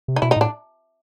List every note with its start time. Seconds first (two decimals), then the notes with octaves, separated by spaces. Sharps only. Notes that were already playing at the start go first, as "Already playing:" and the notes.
0.08 C3
0.16 D#4
0.22 B2 E4
0.31 D#4
0.36 A2 D4